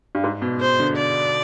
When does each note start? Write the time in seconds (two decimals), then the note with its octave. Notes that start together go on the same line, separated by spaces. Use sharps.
0.15 G2
0.24 G#2
0.42 B2
0.60 C5
0.80 D3
0.97 D5